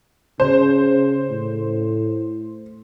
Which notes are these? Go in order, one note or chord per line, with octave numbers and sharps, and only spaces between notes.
C#3 C5
A2